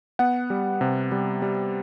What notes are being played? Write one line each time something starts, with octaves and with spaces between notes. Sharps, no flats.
B3 F#5
G3
C3
G3
G3